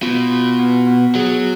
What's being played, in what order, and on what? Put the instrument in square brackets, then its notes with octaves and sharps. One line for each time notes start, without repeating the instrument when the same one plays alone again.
[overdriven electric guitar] B2 [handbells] F4
[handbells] F4
B3
B3
[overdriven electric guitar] F#3 [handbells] G#4